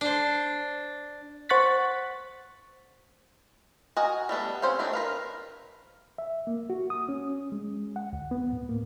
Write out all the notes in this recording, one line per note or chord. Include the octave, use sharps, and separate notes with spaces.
D4 C5
C5 F#5 C#6 F#6 A6 B6
F#4 A#4 D#5 G#5 A#5
G3 A3 B3 D4
C4 C#4 C5 C#5 F5
D#3 A3 B3 D4 F#4
A#4 B4 F5
E5
A#3
F#4
D#6
C#4
G#3
F#5
D2
B3
A2
A#3